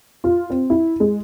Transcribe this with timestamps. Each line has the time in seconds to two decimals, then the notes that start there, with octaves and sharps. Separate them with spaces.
0.24 F4
0.50 C4
0.70 E4
1.00 G#3